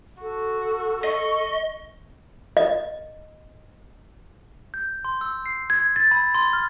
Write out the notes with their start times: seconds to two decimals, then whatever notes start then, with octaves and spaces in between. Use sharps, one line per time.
0.22 F#4 A4
1.04 D#5 C#6
2.57 D#5
4.74 G6
5.05 C6
5.21 E6
5.46 C7
5.70 G#6
5.96 A6
6.11 B5
6.34 C6
6.53 F6